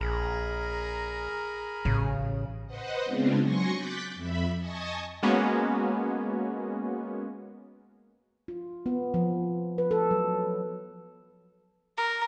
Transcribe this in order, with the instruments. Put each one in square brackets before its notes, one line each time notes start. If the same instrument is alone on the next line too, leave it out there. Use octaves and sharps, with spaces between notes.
[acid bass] A#1 [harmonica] G#4 [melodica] A#4 A#5 B5
[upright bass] A1 [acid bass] C#3
[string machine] B4 C5 D#5 F#5
C#3 G#3 B3 C4 D4 F4
F#3 G#5 C6 C#6 A#6 C#7
D6 F#6 G6 A6 B6
F2 E5 B5
D#5 G#5 A5 C#6 D#6
[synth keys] G#3 A#3 B3 C#4 F#4
[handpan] F4
B3
F3
B4
A4
F#3
[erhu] A#4